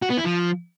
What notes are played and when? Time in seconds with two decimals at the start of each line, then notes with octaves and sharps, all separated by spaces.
0.02 F#4
0.10 B3
0.17 E4
0.25 F3